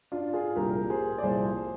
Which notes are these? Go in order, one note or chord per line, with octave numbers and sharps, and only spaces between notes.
D4 F4
F4 G#4
C2 A#2 F3 G4 A#4
G#4 C5
D5
C2 A#2 F3 G#4 C5